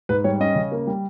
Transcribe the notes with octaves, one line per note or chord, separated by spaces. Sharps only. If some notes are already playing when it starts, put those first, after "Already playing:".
G#2 B4
G3 C#5
C#4 D#5
C#3
A#3
G3